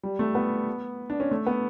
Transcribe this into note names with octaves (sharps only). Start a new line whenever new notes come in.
G3
A3
B3
D4
C#4
A3
B3